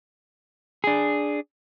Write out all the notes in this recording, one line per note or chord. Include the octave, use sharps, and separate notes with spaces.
D4 G#4